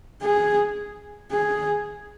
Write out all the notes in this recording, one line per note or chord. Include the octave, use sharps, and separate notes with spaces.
G#4
G#4